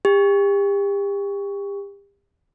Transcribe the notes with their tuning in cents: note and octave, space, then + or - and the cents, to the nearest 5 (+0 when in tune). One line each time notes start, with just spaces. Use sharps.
G4 +35